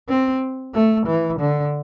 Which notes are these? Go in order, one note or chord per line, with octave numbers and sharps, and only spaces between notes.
C4
A3
E3
D3